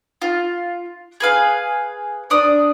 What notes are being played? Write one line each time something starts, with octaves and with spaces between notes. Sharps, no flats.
F4
G#4 B4 F5
D4 D5 D#6